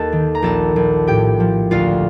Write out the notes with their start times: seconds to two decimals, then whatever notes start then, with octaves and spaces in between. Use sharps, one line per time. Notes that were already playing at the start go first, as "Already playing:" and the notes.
Already playing: D#2 A4 A5
0.12 D#3
0.35 A#5
0.42 A#1 A4 A5
0.76 A#1
1.07 A2 G4 G5
1.40 F3
1.71 D2 F4 F5